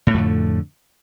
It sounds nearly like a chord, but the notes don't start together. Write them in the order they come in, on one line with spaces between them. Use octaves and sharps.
A2 A3 F2 D3